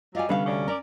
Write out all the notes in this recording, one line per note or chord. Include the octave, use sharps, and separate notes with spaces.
F#3 G3 F4 D#5 G#5
C2 D3 G3 B3 C#4 F5
D2 C#4 D5
C#4 A#4 D5